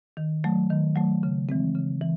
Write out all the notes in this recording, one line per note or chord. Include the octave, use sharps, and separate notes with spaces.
D#3
F#3 A3
D#3
F#3 A3
C#3
E3 G#3 C4
C#3
E3